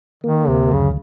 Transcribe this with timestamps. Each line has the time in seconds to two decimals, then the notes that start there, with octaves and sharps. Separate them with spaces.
0.24 D#3 A#3
0.48 D2 C3
0.72 F#2 C#3